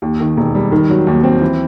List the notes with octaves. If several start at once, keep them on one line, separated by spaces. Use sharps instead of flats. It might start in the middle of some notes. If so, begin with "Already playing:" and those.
D#2
D#3
E1
G3
D#3
F#3
D#2
C4
E3